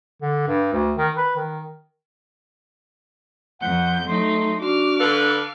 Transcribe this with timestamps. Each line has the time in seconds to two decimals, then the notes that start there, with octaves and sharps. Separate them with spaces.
0.22 D3
0.48 G2
0.73 D2
0.97 D#3
1.17 B4
1.36 D#3
3.62 F2 F#5 G6
4.08 F#3 A3 D#4 C6
4.60 D4 F#4 D6 F6
4.99 D3 A4 B4 F5